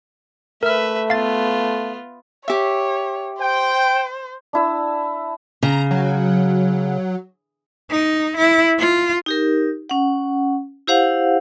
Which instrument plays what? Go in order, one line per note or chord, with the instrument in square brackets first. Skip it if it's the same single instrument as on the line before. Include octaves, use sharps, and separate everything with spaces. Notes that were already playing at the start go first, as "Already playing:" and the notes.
[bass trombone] A3 [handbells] A#4 F6 [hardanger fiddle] B4 E5
[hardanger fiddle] B3 F4 [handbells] F5 A6
[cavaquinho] G4 E5 [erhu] C#5
[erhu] C5 [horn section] G5
[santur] D4 E4 E6
[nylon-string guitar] C#3 [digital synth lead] A#5
[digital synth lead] F#3
[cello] D#4
E4
F4
[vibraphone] D#4 G4 A#4
C#4 F#5
E4 G4 C5 F5 F#5